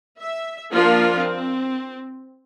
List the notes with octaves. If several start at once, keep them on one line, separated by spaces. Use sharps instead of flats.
E5
F3 A#3 D4 F4 A#4
C4